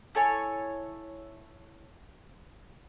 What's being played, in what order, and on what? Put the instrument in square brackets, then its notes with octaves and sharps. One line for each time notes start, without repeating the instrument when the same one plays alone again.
[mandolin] E4 A4 C#5 G#5